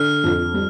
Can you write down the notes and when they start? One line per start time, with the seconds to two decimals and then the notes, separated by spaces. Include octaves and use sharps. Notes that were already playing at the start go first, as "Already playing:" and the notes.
Already playing: D3 F6
0.24 F2
0.54 G3